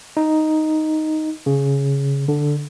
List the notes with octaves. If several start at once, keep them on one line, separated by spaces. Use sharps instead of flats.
D#4
C#3
D3